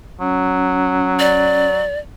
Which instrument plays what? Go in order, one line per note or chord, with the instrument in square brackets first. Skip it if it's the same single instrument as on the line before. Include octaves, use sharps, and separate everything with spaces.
[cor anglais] F#3 [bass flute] C#4
[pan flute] D5